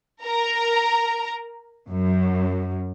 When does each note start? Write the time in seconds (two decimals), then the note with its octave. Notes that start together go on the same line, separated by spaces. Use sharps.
0.24 A#4 A#5
1.88 F#2